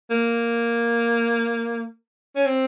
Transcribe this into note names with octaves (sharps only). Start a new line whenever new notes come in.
A#3
C#4
C4